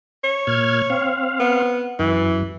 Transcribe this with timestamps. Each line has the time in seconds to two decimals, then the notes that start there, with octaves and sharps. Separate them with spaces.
0.24 C#5
0.47 A#2 F6 G#6
0.90 C4 F5
1.40 B3
1.99 F#2 E3